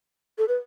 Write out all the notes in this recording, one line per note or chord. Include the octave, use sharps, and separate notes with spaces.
A4
B4